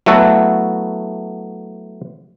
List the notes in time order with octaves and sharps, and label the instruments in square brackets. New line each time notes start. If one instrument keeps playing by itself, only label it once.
[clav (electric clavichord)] F#3 A3 B3 E4 F#4 A4